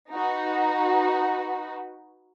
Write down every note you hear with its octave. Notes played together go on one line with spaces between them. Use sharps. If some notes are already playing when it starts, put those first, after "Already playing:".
D#4 F#4 B4